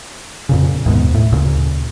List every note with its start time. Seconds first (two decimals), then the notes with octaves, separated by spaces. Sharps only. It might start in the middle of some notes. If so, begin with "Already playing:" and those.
0.49 F2 A#2 C#3
0.86 D#2 G#2 B2
1.14 A2
1.32 D2 A#2 C#3